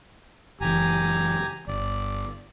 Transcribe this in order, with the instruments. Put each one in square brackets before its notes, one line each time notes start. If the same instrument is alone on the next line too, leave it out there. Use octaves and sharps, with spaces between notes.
[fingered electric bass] F#1 E3 [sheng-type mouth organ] G4 G#5 A#5
[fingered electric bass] G1 [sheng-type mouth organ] D5